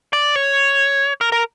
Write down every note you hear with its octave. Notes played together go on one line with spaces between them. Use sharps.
D5
C#5
A#4
A#4